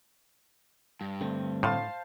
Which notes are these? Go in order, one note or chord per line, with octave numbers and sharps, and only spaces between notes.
G2
D3 A3 C4
A2 C5 F5 A5